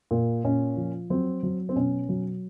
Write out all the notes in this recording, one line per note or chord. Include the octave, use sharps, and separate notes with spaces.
A#2
A#2 C#4
F3
F#3 C4
F#3
C4
B2 C#4
F#3